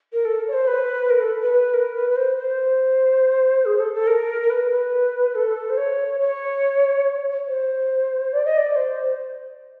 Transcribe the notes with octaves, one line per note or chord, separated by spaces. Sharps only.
A#4
A4
C#5
C5
B4
A#4
A4
B4
B4
A#4
B4
B4
C5
C5
G#4
A4
A4
A#4
A#4
B4
B4
A4
C5
C#5
C#5
C5
D5
D#5
D5
C5